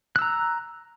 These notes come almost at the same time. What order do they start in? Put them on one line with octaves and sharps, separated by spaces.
F#6 E6 A#5